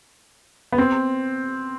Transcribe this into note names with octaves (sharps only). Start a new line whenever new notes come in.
B3
C4